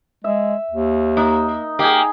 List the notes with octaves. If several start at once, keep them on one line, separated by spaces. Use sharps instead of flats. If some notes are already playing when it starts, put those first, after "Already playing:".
G#3 E5
D#2
A#3 D#4
A#3 D#4 G4 G#4